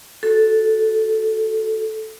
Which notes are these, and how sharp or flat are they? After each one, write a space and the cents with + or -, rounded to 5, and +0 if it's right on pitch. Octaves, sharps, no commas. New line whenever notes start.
F#4 +0 A4 -5